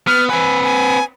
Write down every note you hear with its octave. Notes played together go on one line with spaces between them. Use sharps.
B3 F6
C4 B4 G#5
G#5